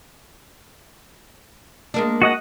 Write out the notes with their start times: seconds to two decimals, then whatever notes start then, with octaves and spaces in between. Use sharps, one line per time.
1.94 G#3 A#3 D4
2.22 F#4 D#5 F#5